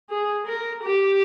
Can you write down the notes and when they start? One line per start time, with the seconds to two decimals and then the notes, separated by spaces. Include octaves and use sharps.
0.10 G#4
0.47 A#4
0.83 G4